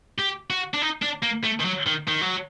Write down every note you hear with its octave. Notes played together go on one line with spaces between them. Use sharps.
G4
F#4
D4
D#4
D4
A#3
A3
D#3
F#3
D#3
D#3
F#3